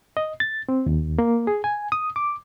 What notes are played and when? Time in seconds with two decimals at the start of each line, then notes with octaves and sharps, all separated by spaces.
0.17 D#5
0.40 A6
0.69 C4
0.86 D#2
1.19 A#3
1.47 G#4
1.64 G#5
1.92 D#6
2.16 D6